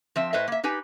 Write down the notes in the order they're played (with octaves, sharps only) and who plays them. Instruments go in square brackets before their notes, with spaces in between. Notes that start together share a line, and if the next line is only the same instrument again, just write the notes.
[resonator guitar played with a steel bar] F3 C4 E5
A2 B4 C5 D#5 E5
A#3 E5
D#4 G4 B4 G#5